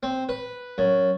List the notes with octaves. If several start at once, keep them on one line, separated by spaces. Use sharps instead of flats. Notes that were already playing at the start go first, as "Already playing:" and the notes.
C4
B4
F#2